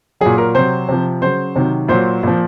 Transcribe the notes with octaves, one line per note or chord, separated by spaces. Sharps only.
A#2 F#3 G#4
A#4
C3 F#3 C5
C3 F3
C#3 F#3 C5
C3 D#3 F#3
A#2 F#3 C5
A#2 F3